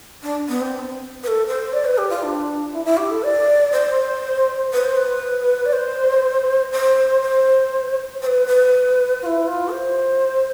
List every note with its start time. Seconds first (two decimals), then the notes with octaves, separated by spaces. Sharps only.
0.23 D4
0.48 B3
0.61 C4
1.23 B4
1.28 A4
1.48 C5
1.73 D5
1.85 B4
1.98 G4
2.10 F4
2.23 D4
2.73 E4
2.85 E4
2.97 G4
3.11 A4
3.23 D5
3.73 C5
4.73 B4
4.85 C5
4.97 B4
5.66 D5
5.73 C5
6.72 C5
7.22 C5
8.22 C5
8.27 B4
8.47 B4
9.22 F4
9.26 E4
9.47 F4
9.72 C5